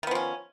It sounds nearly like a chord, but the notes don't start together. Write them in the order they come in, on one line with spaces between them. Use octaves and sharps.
D#3 B3 F3 C#4